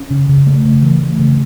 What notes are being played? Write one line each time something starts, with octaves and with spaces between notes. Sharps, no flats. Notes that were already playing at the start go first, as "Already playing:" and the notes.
Already playing: C#4
C#3
C#3
A3
C#3
E3
A3
C#3